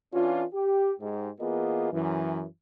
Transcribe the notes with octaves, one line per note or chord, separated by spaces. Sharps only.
E3 C#4 D4 F4
G4
G#2 G4
E3 A#3 B3 F4 G#4 D#5
F#2 E3